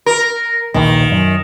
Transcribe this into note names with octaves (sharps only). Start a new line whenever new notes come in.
A#4
A#1 D#2 D#3 E3
F#2